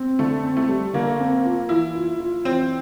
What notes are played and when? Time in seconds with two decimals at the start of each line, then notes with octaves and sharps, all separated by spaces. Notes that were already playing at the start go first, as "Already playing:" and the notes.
Already playing: C4
0.19 D3 A3
0.44 C4
0.57 A3
0.69 G3
0.93 D3 A#3
1.19 C4
1.45 F4
1.69 E3 E4
1.95 F4
2.20 F4
2.44 E3 C4